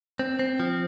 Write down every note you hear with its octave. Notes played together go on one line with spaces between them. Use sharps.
C4
C4
F3